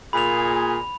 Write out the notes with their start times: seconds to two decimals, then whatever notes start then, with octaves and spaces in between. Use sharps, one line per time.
0.13 A#2 G#4 B5 F7